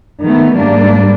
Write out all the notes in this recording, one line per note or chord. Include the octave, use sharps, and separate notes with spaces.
D#3 A3 B3
G#2 G3 A#3 D4